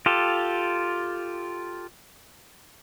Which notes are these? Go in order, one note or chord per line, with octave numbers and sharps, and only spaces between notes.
F4 G4 A4